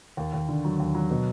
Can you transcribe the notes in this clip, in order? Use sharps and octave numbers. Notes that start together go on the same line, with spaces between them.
D#2
D#2
D3
F#3
D#2
F#3
B2